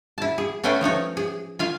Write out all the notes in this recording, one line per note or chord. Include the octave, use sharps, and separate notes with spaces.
E4 A5
G#4
A3 C#4 B4 C5 G5 G#5
F3 A3 D#4 C#5
G#4
F4 F5 G#5